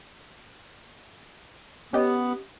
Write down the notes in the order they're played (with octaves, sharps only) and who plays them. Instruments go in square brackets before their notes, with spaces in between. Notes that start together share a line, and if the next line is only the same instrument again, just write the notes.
[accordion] B3 [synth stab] C#4 G4 D#5